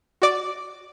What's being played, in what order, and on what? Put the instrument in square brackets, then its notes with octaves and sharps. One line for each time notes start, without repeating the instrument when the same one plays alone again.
[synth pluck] F#4 D5 D6